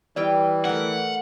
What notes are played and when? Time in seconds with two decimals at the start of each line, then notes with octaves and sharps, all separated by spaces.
0.16 E3 G3 B4 D5 G5
0.65 A3 A#4 F#5